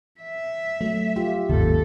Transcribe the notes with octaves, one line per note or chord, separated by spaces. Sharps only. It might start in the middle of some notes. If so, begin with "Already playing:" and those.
E5
F#3 A3
F4 G4
G1 D#2 G#2 C#3 A4